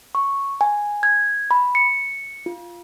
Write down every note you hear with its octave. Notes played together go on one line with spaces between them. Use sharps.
C#6
G#5
G#6
B5
C#7
F4